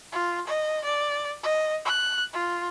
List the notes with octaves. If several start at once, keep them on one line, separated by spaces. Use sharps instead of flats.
F4
D#5
D5
D#5
F#6
F4